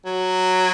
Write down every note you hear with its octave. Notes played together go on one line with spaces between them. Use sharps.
F#3